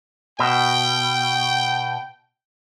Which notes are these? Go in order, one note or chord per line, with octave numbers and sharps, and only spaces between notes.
B2 G5